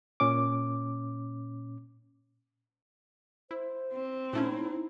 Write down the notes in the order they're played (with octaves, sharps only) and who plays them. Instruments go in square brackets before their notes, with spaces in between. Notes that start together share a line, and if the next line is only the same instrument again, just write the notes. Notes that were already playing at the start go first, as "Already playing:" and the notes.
[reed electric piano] A#2 C#4 D6
[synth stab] E4 [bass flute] C5
[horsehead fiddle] C4
[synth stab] A#2 A3 C#4 [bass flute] D#4 [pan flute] E4